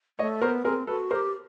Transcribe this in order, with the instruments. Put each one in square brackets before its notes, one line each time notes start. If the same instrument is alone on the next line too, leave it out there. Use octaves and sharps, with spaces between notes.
[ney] A3 [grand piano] C#5 D#5
[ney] B3 [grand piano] A#4 C5
[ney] C4 [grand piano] G#4 A#4
[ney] F#4 [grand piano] A4 B4
[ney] G#4 [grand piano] A#4 C5
[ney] G4